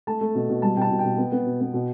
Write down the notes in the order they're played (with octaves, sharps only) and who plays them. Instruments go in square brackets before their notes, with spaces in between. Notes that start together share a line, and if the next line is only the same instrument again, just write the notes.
[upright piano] A3 A5
A3
B2
B2
G3 A5
B2 G5
A5
B2
G5
B2
B3
B3
B2
B3
B2